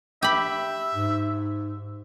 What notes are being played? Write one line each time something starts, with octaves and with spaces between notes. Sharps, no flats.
G4 E5 B5
G#2